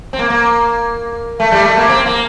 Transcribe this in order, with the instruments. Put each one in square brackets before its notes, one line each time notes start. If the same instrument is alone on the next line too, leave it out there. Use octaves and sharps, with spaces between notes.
[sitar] C4
A#3
A#3
A3
G3
A3
A#3
C4
A#3